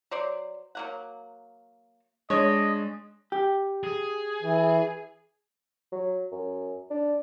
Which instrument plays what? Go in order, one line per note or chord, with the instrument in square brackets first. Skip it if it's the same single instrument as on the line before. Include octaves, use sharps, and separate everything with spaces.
[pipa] F#3 C5 D5
F#3 A#3 F#5
[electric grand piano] G#3 D4 [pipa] C#5 [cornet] D#5
[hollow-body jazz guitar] G4
[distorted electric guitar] G#4
[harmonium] E3
[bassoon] F#3
F#2
D4